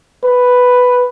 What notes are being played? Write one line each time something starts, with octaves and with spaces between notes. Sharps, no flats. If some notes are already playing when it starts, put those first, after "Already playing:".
B4